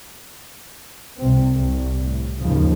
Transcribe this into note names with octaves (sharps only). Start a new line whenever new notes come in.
C2 C3 C4
C2
A2
D#2 G#2 C#3 F3